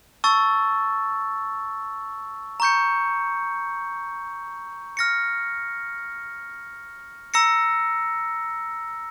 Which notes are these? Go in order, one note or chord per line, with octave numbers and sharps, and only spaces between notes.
A5 C#6 E6 A6
A#5 C#6 G6 C#7
F6 A#6 C#7
A#5 E6 A#6 C#7